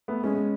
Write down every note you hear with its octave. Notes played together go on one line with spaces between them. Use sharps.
A3 B3
G#3 B3 C#4